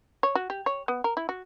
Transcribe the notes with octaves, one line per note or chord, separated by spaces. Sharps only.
C#5
F#4
G4
C#5
B3
A#4
E4
F#4